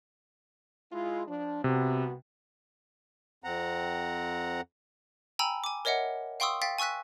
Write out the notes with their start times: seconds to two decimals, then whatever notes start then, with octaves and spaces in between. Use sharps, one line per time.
0.92 G#3 E4 F4
1.28 F3 D4
1.64 C2 C3 B3 F#4
3.44 F2 C4 F#5 A#5
5.39 G5 G#5 A#5 B5 E6
5.64 G#5 D6
5.85 A#4 C#5 D#5 E5 F#5
6.40 F5 G5 C6 C#6 D#6 E6
6.62 F5 G5 A6 B6
6.78 G#5 C#6 E6 F#6 B6